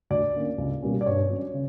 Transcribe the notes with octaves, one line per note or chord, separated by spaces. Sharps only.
D2 D5
D3 A#3 C#4
C#2
B2 G3 A#3 C#4
D5
G2 C#5
F#3 C#4
C#3